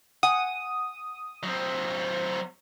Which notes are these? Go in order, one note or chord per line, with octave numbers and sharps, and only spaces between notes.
F#5 G#5 D#6
F#3 C4